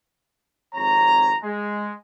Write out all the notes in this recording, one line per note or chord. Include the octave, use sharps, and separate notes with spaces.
G#1 F2 C#5 A#5
G#3